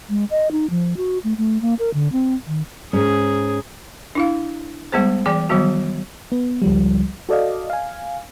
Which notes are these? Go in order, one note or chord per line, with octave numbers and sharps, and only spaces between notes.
G#3
D#5
D#4
F3
F#4
A3
A3
A#3
A#4
D3
C4
D#3
G#2 C#4 G#4
D4 E4 F5
G3 G#3 B3 G#4 C5
E3 G#4 D5 G5 G#5
D#3 F#3 G3 B3 F#4
B3
C#2 F3 G3
F#4 A4 D5 D#5 F5
F5 G#5